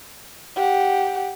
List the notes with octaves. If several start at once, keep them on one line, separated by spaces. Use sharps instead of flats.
G4 F#5